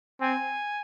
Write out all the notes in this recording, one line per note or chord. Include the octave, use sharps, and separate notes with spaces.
C4 G#5